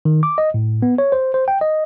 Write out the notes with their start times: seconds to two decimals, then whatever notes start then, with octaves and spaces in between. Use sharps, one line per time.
0.05 D#3
0.23 D6
0.38 D#5
0.54 A2
0.82 B3
0.98 C#5
1.12 C5
1.34 C5
1.48 G5
1.61 D#5